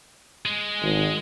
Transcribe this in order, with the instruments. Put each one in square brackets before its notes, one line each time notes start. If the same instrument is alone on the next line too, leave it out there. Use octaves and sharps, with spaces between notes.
[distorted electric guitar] G#3
[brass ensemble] G#1